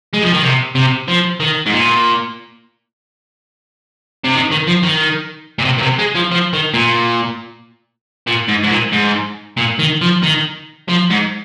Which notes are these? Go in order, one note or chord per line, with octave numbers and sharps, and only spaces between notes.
G#3
F3
D#3
C3
C3
F3
D#3
G#2
A#2
C3
D#3
D#3
F3
D#3
A#2
C3
A#2
C3
G#3
F3
F3
D#3
A#2
A#2
G#2
G#2
A#2
G#2
A#2
D#3
F3
D#3
F3
G#2